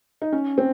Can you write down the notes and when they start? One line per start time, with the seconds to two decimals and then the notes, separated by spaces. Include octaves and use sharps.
0.22 D#4
0.32 C#4
0.58 C4